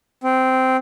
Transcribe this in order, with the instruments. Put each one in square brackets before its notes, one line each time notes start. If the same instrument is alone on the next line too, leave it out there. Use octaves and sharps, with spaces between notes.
[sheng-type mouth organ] C4